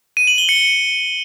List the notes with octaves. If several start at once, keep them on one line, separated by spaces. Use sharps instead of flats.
D#7
F#7
G7
C#7